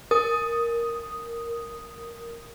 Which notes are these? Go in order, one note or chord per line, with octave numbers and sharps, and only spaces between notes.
A#4 D#6